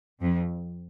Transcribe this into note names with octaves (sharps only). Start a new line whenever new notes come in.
F2